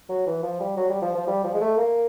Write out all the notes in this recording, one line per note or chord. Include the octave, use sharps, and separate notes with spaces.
F#3
E3
F3
G3
F#3
G3
F3
F3
G3
F3
G#3
A3
A#3